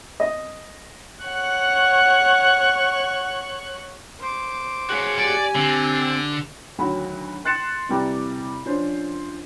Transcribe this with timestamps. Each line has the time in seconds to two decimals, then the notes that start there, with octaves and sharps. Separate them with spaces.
0.20 D#5
1.24 C#5 F#5 C#6 F#6
4.19 C5 D6
4.90 F#4 G#4 C#5
5.18 G4 D5 G#5
5.55 D3 C4
6.78 D2 D#3 F#3 F#4 B5
7.45 C6 F#6 A6 C#7 E7
7.89 C3 E3 G3 G5 A#5 D6
8.66 F3 C#4 D4 C5